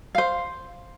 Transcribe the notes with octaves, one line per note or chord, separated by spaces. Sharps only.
C5 F5